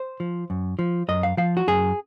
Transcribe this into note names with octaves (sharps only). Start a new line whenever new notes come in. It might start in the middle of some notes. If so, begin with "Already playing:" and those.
Already playing: C5
F3
F#2
F3
F#2 D#5
F5
F3 F5
F#4
F#2 G#4